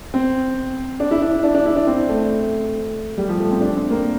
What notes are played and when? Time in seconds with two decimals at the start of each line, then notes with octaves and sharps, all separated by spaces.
0.14 C4
1.00 D4
1.11 E4
1.22 D4
1.33 D4
1.43 D4
1.55 D4
1.66 E4
1.76 D4
1.87 C4
2.09 A3
3.18 G3
3.29 F3
3.40 A3
3.51 C4
3.61 D4
3.76 C4
3.90 A#3